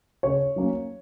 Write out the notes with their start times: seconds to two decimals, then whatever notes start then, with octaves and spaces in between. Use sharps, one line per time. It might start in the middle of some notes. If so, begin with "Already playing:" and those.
0.23 C#3 C#5
0.56 F#3 A#3 C#4